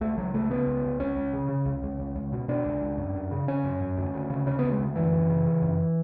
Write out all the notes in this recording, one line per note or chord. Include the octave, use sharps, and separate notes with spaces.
C#2 A3
C#2 F#3
C#3 A3
C#3 B3
C#2
C#2
C#2 C#4
C#2
C#3
C#3
C#2
C#2
C#2
C#2
B2
B2 D4
C#2
C#2
F#2
F#2
C#3
C#3 C#4
F#2
F#2
D2
D2
C#3
C#3 C#4
D2 B3
G#3
D2
F#2 E3
F#2
C#3
C#3
F#2